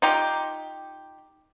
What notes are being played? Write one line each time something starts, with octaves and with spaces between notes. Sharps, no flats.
D#4 F4 G4